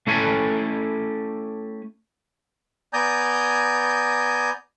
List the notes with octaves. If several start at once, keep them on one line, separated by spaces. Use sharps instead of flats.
A3 C#4 E4 G4 A4 G#5
B3 D5 G#5 A#5 D#6 G6